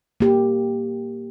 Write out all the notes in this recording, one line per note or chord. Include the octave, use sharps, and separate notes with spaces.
A#3 G4